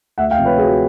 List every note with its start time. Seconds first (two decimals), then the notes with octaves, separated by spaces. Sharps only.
0.18 D2 E5 F#5
0.31 F5 G5
0.38 C3 F3
0.45 B4 C#5
0.58 D2 F#4 G#4